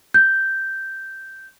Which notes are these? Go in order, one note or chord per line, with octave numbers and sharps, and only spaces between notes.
G6